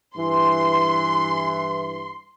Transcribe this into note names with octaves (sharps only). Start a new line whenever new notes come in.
G2 E3 C6